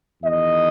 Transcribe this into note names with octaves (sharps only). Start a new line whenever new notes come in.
E2 D#3 D#5